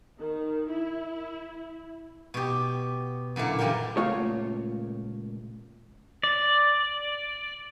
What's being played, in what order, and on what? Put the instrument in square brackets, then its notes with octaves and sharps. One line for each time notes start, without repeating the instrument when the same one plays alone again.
[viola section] D#3
E4
[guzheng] B2 G4
F#2 A#2 D3 E4
D3 E3 G3 F4 G4 A#4
[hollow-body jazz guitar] C#2 A#2 A3 A#3 F4 C#5
[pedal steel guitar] D5